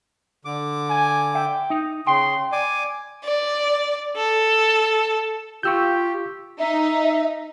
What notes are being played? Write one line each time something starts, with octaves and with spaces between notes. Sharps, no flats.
D3 D6
G#5
E5 G5
D#4
C#3 G5 C6
D5 G#5 D6
D5
A4
F4 G4 C#6 E6 G6
D#4 E5